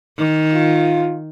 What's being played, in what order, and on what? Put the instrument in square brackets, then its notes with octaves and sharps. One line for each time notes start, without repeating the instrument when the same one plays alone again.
[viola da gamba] D#3
[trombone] F4